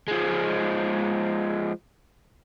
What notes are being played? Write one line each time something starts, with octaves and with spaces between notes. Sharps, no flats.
F3 G#3